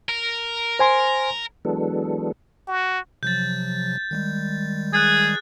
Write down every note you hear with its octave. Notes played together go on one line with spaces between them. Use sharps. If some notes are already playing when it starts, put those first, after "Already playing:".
A#4
C5 G#5 C6
E3 F#3 G#3 B3 D4 A4
F#4
C3 F3 F#3 G6 A6
D#3 G3 G#3
G#4 F#6 A6